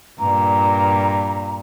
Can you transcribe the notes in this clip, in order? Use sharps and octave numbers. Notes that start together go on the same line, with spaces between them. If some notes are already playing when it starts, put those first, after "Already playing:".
G2 A#2 A#5